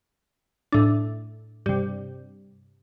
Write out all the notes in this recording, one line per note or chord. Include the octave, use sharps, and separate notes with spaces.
A2 D4
G2 C3